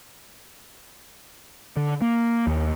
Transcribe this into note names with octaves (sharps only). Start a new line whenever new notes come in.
D3
A#3
D#2